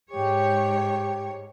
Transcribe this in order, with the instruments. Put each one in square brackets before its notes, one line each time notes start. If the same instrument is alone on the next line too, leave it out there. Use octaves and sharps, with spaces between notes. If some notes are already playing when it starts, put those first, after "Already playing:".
[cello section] G#2 C#5 [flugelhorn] G4